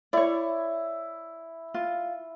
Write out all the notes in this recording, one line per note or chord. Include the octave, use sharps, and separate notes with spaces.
E4 C#5 D5
F4